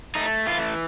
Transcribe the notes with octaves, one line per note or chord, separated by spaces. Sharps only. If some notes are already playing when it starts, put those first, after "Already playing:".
A3 D#4
E3 F4